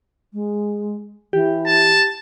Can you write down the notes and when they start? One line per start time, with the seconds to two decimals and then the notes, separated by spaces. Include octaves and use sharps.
0.33 G#3
1.33 E3 G4
1.67 A5